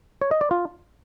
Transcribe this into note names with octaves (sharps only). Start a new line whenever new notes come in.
C#5
D#5
D5
F4